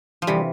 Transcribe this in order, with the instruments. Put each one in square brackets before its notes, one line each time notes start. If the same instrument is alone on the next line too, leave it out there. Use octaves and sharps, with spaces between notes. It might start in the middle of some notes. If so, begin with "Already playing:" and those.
[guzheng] F3
[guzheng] C3 E3 [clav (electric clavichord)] G3